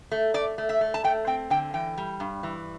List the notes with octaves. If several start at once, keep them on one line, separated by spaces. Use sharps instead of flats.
A3
A3 D5
A3
E5
A3
A5
A3 G5
C4 G5
D3 G5
E3 G5
G3
G2
E3